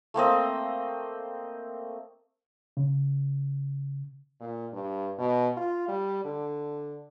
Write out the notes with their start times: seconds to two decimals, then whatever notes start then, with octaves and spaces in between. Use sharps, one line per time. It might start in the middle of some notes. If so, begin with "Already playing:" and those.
0.14 A3 A#3 C4 D#5
2.77 C#3
4.41 A#2
4.73 G2
5.19 B2
5.57 F4
5.88 G3
6.25 D3